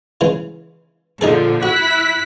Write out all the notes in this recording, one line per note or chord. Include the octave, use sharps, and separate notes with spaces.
C#3 E3 G#3
A#2 D3 F3 D#4 G#4 A4
E4 F#4 F#6 B6